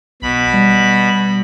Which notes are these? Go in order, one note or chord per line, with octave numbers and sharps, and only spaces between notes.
B1 B2 B5
G3